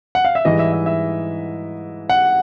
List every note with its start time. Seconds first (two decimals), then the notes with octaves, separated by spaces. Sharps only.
0.15 F#5
0.25 F5
0.35 E5
0.45 G#2 E3 G3 D#5
0.59 E5
0.73 E5
0.86 E5
2.10 F#5